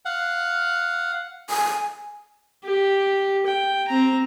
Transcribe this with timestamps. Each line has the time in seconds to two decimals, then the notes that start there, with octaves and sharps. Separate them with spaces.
0.05 F5 F#5
1.50 G#5
2.63 G4
3.46 G5
3.88 C4 A#5